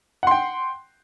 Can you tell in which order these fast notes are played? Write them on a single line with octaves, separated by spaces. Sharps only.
F#5 C6 G5